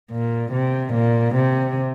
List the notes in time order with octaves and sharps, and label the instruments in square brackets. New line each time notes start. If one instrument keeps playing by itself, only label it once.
[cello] A#2
C3
A#2
C3